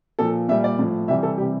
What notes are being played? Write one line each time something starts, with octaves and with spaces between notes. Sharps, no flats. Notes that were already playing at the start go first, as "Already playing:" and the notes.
A#2 F3 A4
A#2 G3 E5
D5
A2 F3
C3 E3 G3 E5
A4
C3 E3 G3 G4